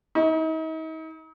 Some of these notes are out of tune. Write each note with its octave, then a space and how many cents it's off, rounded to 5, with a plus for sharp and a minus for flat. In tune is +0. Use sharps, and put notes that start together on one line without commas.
D#4 +40